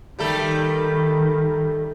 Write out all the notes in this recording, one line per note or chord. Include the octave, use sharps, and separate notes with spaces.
D#3 G3 A3 A4